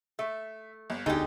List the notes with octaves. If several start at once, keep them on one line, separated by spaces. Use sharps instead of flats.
A3 E5
G1
E1 D2 B2 D3 D#4 G4 G#4